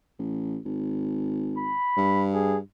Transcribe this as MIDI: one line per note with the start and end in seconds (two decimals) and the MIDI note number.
0.19 0.57 33
0.65 1.75 32
1.59 2.27 83
1.97 2.59 43
2.34 2.57 68